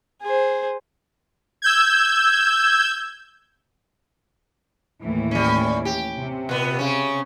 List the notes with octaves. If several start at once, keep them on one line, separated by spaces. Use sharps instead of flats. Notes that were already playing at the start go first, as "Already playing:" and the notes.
G#4 C5
E6 G6 G#6
D#2 A2 E3
G3 C#4
G4
C3
A#2 B3
C#3 C#4